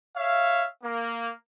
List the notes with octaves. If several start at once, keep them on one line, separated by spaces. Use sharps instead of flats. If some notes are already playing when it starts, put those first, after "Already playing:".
C#5 E5 F5
A#3